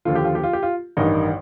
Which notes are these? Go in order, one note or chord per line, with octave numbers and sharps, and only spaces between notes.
D#2 D3 F3 F4
G4
F4
G4
F4
G4
F4
A1 G2 D#3 D#4